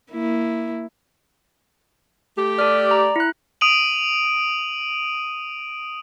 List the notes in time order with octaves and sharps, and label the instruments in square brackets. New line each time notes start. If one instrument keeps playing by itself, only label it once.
[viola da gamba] A#3 E4
[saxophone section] A3 G4
[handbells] A4 F6 [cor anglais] D5
[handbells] A#5
E4 F#6
[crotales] D#6 D7 D#7 F#7